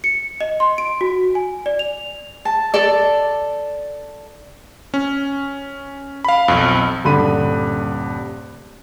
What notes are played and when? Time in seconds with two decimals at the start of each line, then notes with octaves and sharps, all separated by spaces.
0.04 C#7
0.41 D#5
0.60 C6
0.78 D7
1.01 F#4
1.35 G#5
1.66 D5
1.79 F7
2.45 A5
2.74 A4 D5
4.94 C#4
6.24 F5 B5
6.48 B1 F2
7.04 D#1 G2 D3 B5 D#7